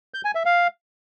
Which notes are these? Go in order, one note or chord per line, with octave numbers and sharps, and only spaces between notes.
G6
G#5
E5
F5